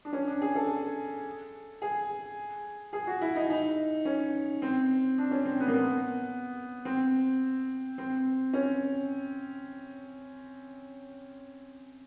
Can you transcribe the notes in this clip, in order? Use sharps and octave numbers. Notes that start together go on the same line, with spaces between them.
D4
C#4
D4
G#4
A4
G#4
G#4
F#4
E4
D#4
D#4
C#4
C4
D4
C#4
C4
B3
A#3
B3
C4
C4
C#4